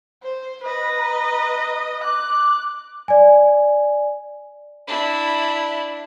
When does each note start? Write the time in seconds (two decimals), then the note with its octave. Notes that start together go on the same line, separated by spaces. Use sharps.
0.24 C5
0.64 B4 D#5
0.97 A#5
2.05 D6 F#6
3.08 D5 G#5
4.87 D4 E4